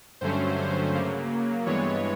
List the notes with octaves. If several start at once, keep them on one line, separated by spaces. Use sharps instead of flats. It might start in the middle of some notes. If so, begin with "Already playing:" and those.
G2 D3 F#3 A3 C#4 C5
C5
C#3 F#3 A#3
G2 E3 G#3 B3 C#5